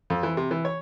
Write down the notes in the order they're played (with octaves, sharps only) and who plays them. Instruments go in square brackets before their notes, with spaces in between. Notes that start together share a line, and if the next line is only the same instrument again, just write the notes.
[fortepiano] F2
E3
C3
E3
C#5